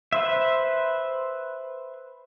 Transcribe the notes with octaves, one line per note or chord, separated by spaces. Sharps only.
B4 C5 E5